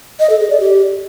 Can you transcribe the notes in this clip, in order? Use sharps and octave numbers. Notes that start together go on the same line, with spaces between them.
D#5
A4
G#4
D5
G4